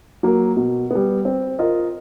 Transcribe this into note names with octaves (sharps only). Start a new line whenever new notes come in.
F#3 A#3
B2
G3 B3
C4
F4 A#4 D#5